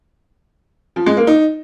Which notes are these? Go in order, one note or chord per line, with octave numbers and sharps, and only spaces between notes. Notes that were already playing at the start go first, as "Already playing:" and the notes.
F3
G#3
A#3
D#4